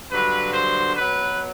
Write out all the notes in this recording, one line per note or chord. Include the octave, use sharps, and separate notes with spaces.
G2 D3 F#3 B4
C5
B2 F#3 B4